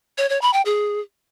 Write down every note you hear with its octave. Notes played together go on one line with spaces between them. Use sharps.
C#5
C#5
B5
G5
G#4